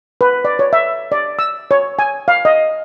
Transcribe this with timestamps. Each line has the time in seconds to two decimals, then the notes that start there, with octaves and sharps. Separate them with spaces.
0.21 B4
0.45 D5
0.59 C#5
0.73 E5
1.12 D5
1.39 E6
1.71 C#5
1.99 G#5
2.28 F5
2.45 D#5